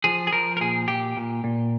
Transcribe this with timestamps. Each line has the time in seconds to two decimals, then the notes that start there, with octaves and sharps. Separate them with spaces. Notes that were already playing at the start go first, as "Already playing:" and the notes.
0.04 F3 G#4
0.27 G#4
0.32 F3 A#4
0.57 A#4
0.61 A#2 G#4
0.88 A#2 G4
1.17 A#2
1.44 A#2